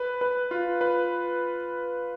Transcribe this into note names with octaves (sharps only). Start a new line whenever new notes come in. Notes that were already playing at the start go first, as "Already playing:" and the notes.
Already playing: B4
B4
F4
B4